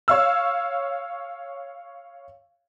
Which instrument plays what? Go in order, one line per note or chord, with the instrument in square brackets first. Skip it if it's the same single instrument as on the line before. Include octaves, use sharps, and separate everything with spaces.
[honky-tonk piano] C#5 F5 E6